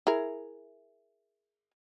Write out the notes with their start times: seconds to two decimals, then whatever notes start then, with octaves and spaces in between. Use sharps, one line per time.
0.07 E4 G#4 A#4